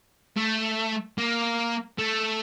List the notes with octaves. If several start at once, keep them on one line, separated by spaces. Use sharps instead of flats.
A3
A#3
A3